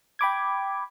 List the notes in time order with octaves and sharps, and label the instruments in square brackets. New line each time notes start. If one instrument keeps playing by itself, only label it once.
[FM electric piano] G5 B5 D6 G#6